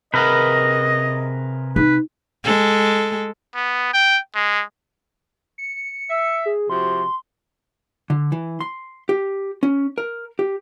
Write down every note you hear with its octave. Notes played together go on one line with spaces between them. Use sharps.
C3 G#4 A#4 B4 D#5 F#5
D#4 B4
G#3 A4
B3
G5
G#3
C#7
E5
G#4
C3 F3 F#4 C6
D3
E3
C6
G4
C#4
A#4
G4